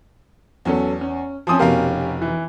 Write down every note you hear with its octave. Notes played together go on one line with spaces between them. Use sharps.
E2 F#3 C#4 A4
C#4
F3 C4 C#4 G#5 D#6
F1 B2 C#4 G4 A#4 F5
E3